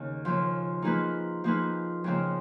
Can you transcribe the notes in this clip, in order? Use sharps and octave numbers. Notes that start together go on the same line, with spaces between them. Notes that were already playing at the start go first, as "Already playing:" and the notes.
Already playing: D#2 C#3
D#2 C#3 F3
F3 A#3 D#4 G#4 B4
F3 A#3 D#4 G#4 B4
F2 C#3 F3 A#3